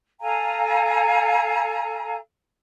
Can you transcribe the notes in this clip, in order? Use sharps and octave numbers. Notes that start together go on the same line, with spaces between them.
A4 F5 G#5 A#5